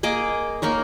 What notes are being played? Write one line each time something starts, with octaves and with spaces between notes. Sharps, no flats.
A#3 G#4 D#5 D6
A#3 D#4 A#4 C#5